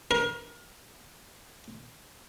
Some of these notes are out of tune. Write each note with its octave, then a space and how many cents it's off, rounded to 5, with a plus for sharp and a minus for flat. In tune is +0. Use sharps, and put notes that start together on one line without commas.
A#4 +30